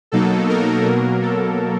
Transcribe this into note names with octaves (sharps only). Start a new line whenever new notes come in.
B2 F#3 A#3 D#4 A4
A#4
B2 F#3 A#3 A#4
A4